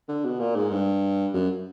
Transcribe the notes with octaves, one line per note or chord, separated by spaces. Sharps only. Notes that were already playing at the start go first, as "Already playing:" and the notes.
D3
B2
A#2
G#2
G2
F#2